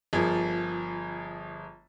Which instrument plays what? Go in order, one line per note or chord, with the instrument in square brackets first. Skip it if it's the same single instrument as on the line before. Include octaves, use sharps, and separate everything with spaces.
[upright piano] G1 F3 G#4 A#4